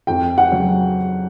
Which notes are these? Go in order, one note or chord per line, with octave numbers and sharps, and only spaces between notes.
F2 G5
F#5
C#3 F#3